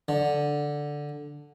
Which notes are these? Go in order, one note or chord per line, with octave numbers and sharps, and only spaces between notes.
D3